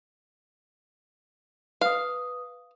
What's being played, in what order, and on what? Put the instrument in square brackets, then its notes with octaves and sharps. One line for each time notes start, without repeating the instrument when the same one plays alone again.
[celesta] B4 D#6 [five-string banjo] F5